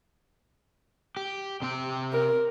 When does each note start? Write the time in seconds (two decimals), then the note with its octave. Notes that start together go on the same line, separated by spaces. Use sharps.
1.17 G4
1.62 C3 C4 G5
2.13 A#4